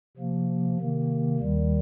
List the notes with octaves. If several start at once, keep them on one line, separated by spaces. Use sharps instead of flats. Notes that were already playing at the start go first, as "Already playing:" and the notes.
C3 F3 A#3
C3 D#3 A#3
D#2 D#3 G3